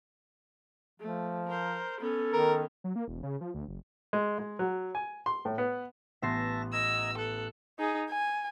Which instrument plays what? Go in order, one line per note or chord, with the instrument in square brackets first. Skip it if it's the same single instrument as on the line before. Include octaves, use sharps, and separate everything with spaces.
[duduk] F3 [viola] A3
[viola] A#4 C5
[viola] B3 C#4 [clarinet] A4
[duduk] D#3 [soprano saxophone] A#4
[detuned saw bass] F#3
A#3
E1
C#3
F3
D2
F#1
[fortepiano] G#3
G#3
F#3
G#5
C6
A2
B3
[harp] A1 C6 C7 [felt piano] B3 [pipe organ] E5 A5 A#6
[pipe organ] D#5 A#5 G#6 [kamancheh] E6
[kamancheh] A4 [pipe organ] F#6
[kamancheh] D#4 G#4
G#5